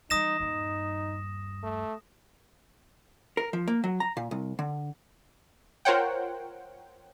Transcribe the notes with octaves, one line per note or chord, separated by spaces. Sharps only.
E3 G3 D#4 D#6 A#6 E7
D#1 G2 D#4
A3
A#4
F3
A#3
F#3
A#5
A#2
C2
D3
F4 A#4 C5 C#5 F#5 G5